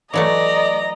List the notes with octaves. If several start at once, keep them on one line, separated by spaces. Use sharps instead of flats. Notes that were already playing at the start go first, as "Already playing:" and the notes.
E3 F#3 A3 D5 D#5 A#5